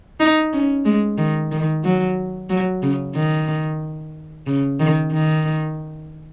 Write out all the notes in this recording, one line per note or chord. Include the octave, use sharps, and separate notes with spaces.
D#4
C#4
G#3
D#3
D#3
F#3
F#3
C#3
D#3
C#3
D#3
D#3